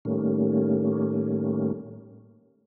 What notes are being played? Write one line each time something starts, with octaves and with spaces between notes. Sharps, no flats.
A2 D#3 G3 A3 A#3 C#4